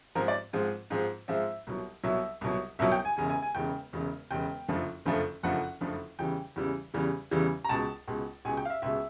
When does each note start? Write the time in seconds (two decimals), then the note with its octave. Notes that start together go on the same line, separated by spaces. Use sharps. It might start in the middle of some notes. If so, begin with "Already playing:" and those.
0.15 G#2 F3 G#3 C4 A#4
0.28 D5
0.53 G#2 F3 G#3 C4
0.90 G#2 F3 G#3 C4
1.28 G#2 F3 G#3 C4 E5
1.67 C2 B2 F#3
2.04 C2 B2 F#3 E5
2.41 C2 B2 F#3
2.79 C2 B2 F#3 E5
2.92 G5
3.05 G#5
3.17 E1 E2 C#3 G#5
3.29 G#5
3.42 G#5
3.55 E1 E2 C#3 G5
3.93 E1 E2 C#3
4.31 E1 E2 C#3 G5
4.68 F#1 F2 D3 F3 A3
5.05 F#1 F2 D3 F3 A3
5.43 F#1 F2 D3 F3 A3 F#5
5.81 F#1 F2 D3 F3 A3
6.19 E2 C#3 E3 G3 G5
6.56 E2 C#3 E3 G3
6.94 E2 C#3 E3 G3
7.31 E2 C#3 E3 G3
7.65 A#5
7.69 C#2 B2 G#3 A5
8.08 C#2 B2 G#3
8.45 C#2 B2 G#3 G#5
8.57 G5
8.65 F5
8.70 E5
8.82 C#2 B2 G#3 E5